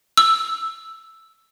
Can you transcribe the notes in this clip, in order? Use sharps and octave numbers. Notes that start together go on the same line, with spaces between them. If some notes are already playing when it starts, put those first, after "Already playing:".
E6